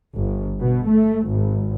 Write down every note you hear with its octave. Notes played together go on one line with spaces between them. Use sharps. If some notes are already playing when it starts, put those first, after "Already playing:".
G1
B2
A3
G#1